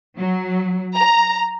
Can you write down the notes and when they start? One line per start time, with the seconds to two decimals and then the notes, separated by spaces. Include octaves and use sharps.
0.17 F#3
0.96 A#5